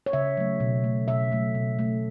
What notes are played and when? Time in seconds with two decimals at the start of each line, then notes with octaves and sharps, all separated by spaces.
0.06 C#5
0.13 C#3 E5
0.37 F#3 A3
0.60 B2
0.84 A3
1.08 B2 E5
1.32 F#3 A3
1.55 B2
1.79 A3